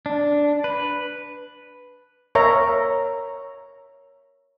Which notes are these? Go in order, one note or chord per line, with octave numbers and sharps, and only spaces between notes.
D4
B4
A#4 C#5 E5 A#5